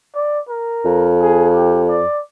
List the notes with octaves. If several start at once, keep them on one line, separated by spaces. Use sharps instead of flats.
D5
A#4
F2
G#4
G4
D5